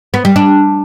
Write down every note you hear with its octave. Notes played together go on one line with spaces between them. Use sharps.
B3
G3
D4